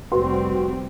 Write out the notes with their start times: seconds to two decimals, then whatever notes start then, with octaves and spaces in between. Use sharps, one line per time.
0.12 F1 G3 C4 F#4 B4 C6